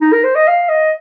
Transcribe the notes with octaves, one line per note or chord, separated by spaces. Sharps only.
D#4
A#4
C5
D#5
F5
D#5